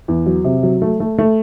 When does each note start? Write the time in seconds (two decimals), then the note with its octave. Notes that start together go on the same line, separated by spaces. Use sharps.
0.08 E2
0.26 F#3
0.44 C3
0.63 F#3
0.82 A3
1.00 A3
1.18 A3